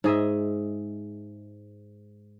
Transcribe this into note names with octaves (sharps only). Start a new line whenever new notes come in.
G#2 G#4 D#5 E5